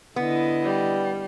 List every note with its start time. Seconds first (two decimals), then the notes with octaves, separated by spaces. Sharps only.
0.16 D3 B3 E4 D#5
0.63 G3